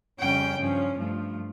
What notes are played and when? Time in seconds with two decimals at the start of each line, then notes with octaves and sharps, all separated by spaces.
0.19 F2 C#3 G3 C#4 G5
0.58 G2 F3 C#4
0.97 G2 F3 A3